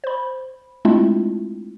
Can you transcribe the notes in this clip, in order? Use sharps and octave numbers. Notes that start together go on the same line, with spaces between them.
C5 B5
G#3 A3 C4 D4 E4 F4